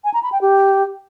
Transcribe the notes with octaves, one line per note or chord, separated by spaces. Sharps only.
G#5
A#5
B5
G5
G4